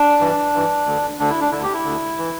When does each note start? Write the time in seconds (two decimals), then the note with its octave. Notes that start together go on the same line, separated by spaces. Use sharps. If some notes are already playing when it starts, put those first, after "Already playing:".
Already playing: D4
0.19 G2 E3
0.53 G2 E3
0.85 D2 D3
1.19 D2 D3 D4
1.30 E4
1.41 D4
1.52 D2 D3 E4
1.63 G4
1.74 E4
1.85 D2 D3
2.18 E3